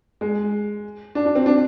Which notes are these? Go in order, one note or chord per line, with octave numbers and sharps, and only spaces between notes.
G#3
D4
D4
C4
D4